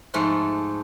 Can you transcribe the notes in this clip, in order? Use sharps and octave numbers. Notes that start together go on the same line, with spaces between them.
G#2 F3 A3 F#5